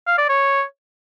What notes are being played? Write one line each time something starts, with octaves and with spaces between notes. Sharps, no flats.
F5
D5
C#5